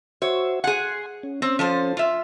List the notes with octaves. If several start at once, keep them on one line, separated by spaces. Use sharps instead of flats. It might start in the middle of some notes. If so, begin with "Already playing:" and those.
F#4 C5 C#5 E5
G#4 F#5 G#5 C6
C#4
C4 C#4
F3 A4 C5
F4 E5